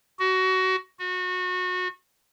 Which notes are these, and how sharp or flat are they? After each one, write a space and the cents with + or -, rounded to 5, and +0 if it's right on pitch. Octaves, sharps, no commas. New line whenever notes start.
F#4 +20
F#4 -25